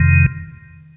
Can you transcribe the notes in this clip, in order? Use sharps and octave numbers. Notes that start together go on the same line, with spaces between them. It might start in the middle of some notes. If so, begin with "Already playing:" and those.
Already playing: F2 C3 D#3